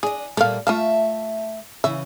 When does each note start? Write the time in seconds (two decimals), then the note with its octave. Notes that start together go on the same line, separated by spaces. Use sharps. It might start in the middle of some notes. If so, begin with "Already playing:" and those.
0.03 D4 G#4 D#5
0.37 A#2 G3 A3 A#3 F5
0.67 A3 F4 E5 F5 A5
1.84 C#3 E3 E5